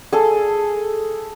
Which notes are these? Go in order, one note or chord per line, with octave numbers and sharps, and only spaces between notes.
G#4 A4